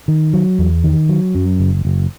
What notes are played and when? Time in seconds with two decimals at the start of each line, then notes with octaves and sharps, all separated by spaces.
0.08 D#3
0.33 F#3
0.59 E2
0.84 D#3
1.09 F#3
1.35 F#2
1.60 F#1
1.85 F#1